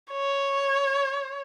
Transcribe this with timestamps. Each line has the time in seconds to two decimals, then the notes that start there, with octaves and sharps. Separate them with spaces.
0.12 C#5